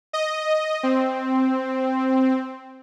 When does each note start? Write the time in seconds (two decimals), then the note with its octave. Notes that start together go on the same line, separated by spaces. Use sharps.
0.13 D#5
0.83 C4